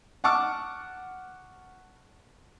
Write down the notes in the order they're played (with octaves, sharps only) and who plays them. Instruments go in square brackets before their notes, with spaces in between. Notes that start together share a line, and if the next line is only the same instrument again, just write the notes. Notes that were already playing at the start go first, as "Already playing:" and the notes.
[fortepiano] F#5 A5 C#6 D6 F6